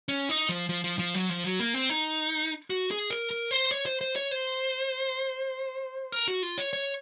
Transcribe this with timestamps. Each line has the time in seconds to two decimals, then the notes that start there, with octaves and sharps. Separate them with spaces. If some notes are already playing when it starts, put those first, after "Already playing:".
0.08 C#4
0.29 D#4
0.49 F3
0.69 F3
0.84 F3
0.99 F3
1.14 F#3
1.29 F3
1.44 F#3
1.60 A#3
1.74 C4
1.90 D#4
2.70 F#4
2.91 G#4
3.10 A#4
3.31 A#4
3.51 C5
3.71 C#5
3.86 C5
4.01 C5
4.16 C#5
4.31 C5
6.12 A#4
6.28 F#4
6.43 F4
6.58 C#5
6.73 C#5